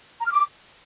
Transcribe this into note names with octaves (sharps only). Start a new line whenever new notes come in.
A#5
F6
D6